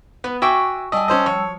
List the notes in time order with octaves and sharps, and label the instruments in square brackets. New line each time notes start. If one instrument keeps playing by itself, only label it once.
[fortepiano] B3 [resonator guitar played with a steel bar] B4
[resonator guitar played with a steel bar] F#4 E5 G5 [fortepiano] G#5 D6 E6
[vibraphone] G3 A5 E6 [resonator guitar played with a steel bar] D5 G#5 [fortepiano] D#5
[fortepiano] C#4 C5 D#5
[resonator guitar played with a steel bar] F3 [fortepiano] C#5